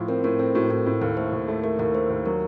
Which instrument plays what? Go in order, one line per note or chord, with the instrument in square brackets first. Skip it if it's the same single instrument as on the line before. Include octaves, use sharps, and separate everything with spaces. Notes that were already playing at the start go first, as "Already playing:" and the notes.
Already playing: [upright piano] A2 F3
[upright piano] C4 [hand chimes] A#4
[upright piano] A2 [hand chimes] A#4
[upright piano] C4 [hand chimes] A4
[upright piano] A2 [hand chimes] F#4
[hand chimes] A#4
[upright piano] A2 [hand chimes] A4
[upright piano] A2
[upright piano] D#2 [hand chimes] A4
[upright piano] A3 [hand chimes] C5
[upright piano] D#2
A3
[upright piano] A3 [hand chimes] A#4
[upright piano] D#2 [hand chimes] A#4
[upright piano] A3 [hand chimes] C5
[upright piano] D#2
[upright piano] F#3 [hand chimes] A#4